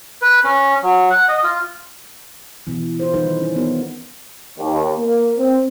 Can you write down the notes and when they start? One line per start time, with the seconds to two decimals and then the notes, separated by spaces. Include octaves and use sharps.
0.22 B4
0.44 C#4
0.83 F#3
1.10 F#5
1.28 D#5
1.43 F4
2.67 B2 E3
3.00 F4 C5
3.13 D#3 E3 G3 D#4 A4 B4
3.41 C#4
3.56 B3 D#4 F4 A#4
4.59 D#2
4.98 A#3
5.37 C4